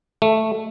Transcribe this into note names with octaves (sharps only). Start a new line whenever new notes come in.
A3